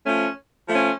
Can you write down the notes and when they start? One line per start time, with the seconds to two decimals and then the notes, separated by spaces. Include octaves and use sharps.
0.04 F3 A3 C#4
0.69 F3 A3 C#4